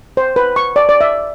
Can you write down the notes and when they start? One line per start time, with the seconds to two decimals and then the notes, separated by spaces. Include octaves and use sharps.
0.17 C5
0.36 B4
0.56 C#6
0.76 D5
0.89 D5
1.01 E5